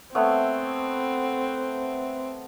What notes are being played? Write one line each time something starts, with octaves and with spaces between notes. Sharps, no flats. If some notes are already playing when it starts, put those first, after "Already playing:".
A3 B3 C4 C#5